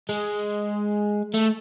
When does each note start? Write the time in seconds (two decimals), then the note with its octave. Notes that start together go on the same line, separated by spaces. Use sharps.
0.09 G#3
1.34 A3